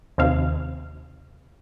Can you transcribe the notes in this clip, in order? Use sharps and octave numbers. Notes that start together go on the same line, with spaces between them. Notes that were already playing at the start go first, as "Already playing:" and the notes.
D#2 C3 F5